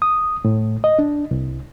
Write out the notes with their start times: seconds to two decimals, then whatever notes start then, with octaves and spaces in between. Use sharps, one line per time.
0.02 D#6
0.45 A2
0.84 D#5
0.99 D4
1.31 C2